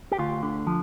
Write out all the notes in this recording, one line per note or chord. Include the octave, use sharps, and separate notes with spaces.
G4
D2 F4
D3
F3